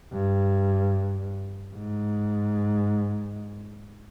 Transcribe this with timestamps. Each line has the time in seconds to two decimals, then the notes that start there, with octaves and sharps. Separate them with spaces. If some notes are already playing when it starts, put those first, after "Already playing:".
0.13 G2
1.76 G#2